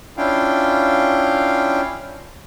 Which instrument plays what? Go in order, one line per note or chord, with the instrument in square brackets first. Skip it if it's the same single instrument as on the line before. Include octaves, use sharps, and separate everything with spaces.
[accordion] C#4 D4 E4 F4 F5 G5